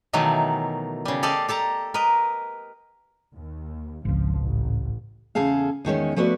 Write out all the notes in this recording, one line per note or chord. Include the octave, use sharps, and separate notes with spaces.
B2 D#3 E3 F#3 A3
C#3 G3
G4 A4 D5 D#5 F5
G4 A4 A5 A#5
A#4 B4 D#5
D#2
G#1 C#2 F3
A1
E2 C#3 G#4 A4 F5
E2 D#3 G#3 C#4
F3 A3 B3 F#4 B4 D5